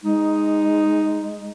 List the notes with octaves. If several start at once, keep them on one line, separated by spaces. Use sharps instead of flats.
G#3 D#4